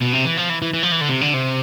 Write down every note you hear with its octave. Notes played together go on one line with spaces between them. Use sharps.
B2
C3
E3
F3
E3
E3
E3
F3
E3
D3
C3
D3
C3